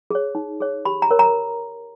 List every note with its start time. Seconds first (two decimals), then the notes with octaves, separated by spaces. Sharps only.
0.11 G#4 C#5
0.35 D#4
0.60 G#4 C#5
0.85 G4 B5
1.02 A#5
1.11 A#4 C#5
1.19 A#5